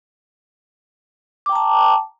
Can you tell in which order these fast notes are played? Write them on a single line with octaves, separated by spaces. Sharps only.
D6 G5 A#5 A5